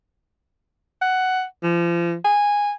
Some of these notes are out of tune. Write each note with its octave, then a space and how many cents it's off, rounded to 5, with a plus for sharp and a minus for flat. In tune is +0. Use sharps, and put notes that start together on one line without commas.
F#5 +10
F3 -35
G#5 -10